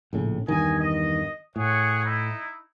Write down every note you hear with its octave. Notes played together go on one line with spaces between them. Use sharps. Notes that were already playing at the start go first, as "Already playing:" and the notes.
A#1 A2 C#3
E2 G2 D#3 D#5 G#5
D#5
A2 G#4 C#5 F#5
D#4 E4